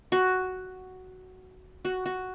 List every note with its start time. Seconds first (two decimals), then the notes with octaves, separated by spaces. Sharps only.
0.12 F#4
1.85 F#4
2.06 F#4